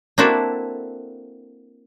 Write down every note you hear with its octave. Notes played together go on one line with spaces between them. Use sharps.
A#3 C4 D4 E4 F#4 A4